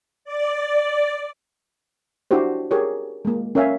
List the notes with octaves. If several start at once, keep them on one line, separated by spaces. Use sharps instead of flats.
D5
D4 E4 F#4 G4 C5
G4 G#4 A#4 C#5
G#3 A#3
C#4 A#4 C#5 E5 F5 G#5